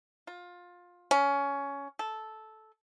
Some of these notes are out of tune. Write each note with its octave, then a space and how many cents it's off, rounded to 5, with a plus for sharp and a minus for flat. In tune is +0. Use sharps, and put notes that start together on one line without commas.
F4 +20
C#4 +15
A4 -10